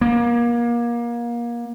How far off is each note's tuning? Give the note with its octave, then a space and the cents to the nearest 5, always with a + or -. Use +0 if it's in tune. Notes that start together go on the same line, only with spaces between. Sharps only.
A#3 +30